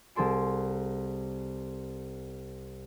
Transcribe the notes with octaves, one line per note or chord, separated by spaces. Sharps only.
C2 G#4 A4 C6 D7